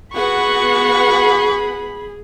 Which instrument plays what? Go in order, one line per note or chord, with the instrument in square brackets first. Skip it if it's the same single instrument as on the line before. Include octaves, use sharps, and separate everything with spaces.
[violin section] B3 F#4 F#5 [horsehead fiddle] G#4 [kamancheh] B5 [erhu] C#6